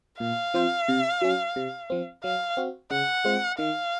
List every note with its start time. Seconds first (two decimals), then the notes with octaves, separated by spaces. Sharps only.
0.20 A#2 F5
0.54 F3 C4 F4 C5
0.88 C3
1.22 F#3 C#4
1.56 C3
1.90 F3 C4
2.23 F#3 F5
2.57 C4 F#4
2.91 C#3 F#5
3.25 G#3 C4 F4
3.58 D#3 F5